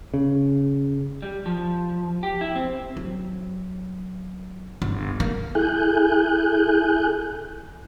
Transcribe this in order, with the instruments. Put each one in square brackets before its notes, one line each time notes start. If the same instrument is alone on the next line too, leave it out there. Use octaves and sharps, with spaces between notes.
[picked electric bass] C#3
[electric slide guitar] G3
F3
G4
E4
C4
[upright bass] F#3
G1
A#3
[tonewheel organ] E4 G#4 A4 G#5 F#6 G6